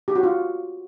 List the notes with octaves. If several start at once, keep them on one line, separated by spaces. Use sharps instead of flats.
G4
F#4
F4